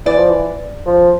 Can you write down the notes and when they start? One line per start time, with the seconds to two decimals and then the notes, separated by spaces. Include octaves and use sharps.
0.06 E3 D5
0.18 F3
0.30 E3
0.86 F3